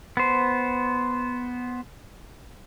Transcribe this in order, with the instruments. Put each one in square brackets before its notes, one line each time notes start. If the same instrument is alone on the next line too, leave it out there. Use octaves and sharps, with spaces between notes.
[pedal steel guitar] B3 C5